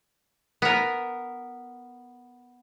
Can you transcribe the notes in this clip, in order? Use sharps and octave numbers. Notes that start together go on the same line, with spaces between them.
B3 A#4